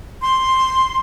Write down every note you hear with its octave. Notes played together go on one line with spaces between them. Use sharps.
C6